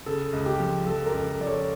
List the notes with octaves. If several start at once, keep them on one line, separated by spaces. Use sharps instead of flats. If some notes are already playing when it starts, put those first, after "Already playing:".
C#3 A4
C#2
G4
F3
F3 A4
G4 A#4
C#2
F3 D5
A4 C#5